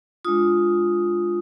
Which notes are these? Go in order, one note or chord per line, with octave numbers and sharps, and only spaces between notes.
G#3 D4 F4 D#6